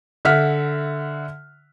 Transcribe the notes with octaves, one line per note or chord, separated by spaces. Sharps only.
D3 E5 F#5 F6 B6